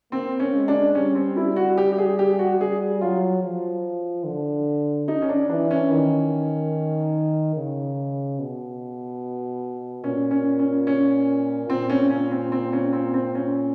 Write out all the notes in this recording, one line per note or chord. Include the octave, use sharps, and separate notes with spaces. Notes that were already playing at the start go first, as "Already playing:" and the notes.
A#3 C4
C#4
G#3
D4
G3 C#4
C4
E4
F#4
G4
G4
G#4
G4
F#4
G3 G#4
F#3 F4
F3
D3
D#4
C#4
D4
E3 D4
C#4
D#3
C#3
B2
A#2 C#4
C#4
C#4
C#4
A#2 C4
C#4
C#4
C4
C4
C#4
C4
C4
C#4